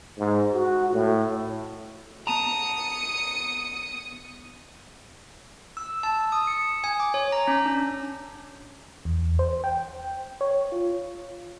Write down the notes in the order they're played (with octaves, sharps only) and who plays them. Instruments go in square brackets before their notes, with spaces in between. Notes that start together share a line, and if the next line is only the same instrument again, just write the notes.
[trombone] G#2
F#4
A2
[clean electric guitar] B3 A5 A#5 [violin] D#6 C#7
[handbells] E6
A5
D#6
C#7
G#5
D6
C#5
A#5
C#4
D4
[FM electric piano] E2
C5
G5
C#5
F4